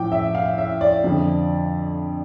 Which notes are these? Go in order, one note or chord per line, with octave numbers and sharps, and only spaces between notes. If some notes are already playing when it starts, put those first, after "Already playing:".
Already playing: A2 F3 G5 D6
E5
F5
E5
D5
F2 D3 F3